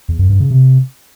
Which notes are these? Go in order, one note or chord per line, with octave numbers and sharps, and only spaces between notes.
E2
F#2
G2
C#3
C3